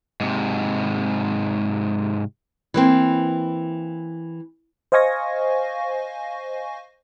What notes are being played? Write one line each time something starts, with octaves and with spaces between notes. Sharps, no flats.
G#2 C3
E3 A#3 C4
C5 D#5 F5 G#5 C#6 A#6